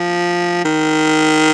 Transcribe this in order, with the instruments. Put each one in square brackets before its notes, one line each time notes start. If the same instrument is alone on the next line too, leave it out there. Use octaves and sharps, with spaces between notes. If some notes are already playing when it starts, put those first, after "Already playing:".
Already playing: [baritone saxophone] F3
D#3